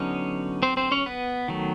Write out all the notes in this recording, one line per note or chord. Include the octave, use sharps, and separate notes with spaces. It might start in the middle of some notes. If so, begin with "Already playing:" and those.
Already playing: D3 F#3 B3 C#4 D#4 C#5
C4 C5
C4 C5
C#4 C#5
B3 B4
D#3 F#3 A3